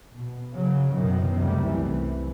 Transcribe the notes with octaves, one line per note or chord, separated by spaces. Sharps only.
B2
C#3 F#3
C2 F#2 B2 D#3 E3 F#3
C#2 F#2 C3 G3 A3
C2 E3